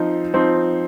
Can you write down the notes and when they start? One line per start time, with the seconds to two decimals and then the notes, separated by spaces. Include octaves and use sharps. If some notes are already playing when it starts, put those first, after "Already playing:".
Already playing: F3 C4 D#4
0.34 F3 C4 D#4